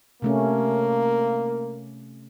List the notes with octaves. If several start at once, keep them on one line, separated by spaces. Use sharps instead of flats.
C3 A3 A#3 C#4